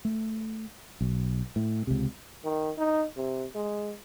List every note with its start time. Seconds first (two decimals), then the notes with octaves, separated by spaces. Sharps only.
0.05 A3
1.01 B1
1.56 A2
1.87 C#2 C3
2.45 D#3
2.78 D#4
3.17 C3
3.55 G#3